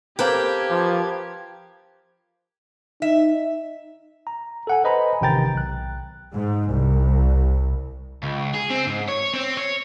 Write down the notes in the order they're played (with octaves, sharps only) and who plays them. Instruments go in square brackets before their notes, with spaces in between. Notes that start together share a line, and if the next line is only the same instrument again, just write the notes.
[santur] A#3 B4 [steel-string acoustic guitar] C4 A4 G5 [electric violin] G4 G#6
[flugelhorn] F3
[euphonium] D#4 [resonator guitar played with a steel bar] E5
[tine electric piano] A#5
A4 F#5 G#5
B4 C5 D#5 G#5 A#5 B5
A1 C3 D#3 G5 A#5 A6
B1 F#6
[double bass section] G#2
C2
[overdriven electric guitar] C#2
G#4
C4
G#2
C#5
C4
C#5